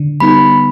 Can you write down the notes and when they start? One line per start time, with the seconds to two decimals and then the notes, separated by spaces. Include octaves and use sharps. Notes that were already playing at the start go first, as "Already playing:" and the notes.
Already playing: D3
0.20 G3 B3 D#4 B5